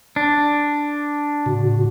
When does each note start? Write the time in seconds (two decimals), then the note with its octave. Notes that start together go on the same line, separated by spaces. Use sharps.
0.16 D4
1.46 A2 C#3 F#4